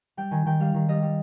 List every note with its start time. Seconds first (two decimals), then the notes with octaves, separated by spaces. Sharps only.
0.17 G3 G5
0.31 D#3 G#5
0.46 D#3 G5
0.60 G3 F5
0.74 D#3
0.88 G3 D#5
1.02 G3